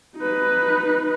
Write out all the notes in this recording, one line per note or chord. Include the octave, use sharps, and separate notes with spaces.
D#4 B4